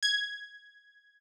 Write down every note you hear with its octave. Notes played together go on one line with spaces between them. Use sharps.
G#6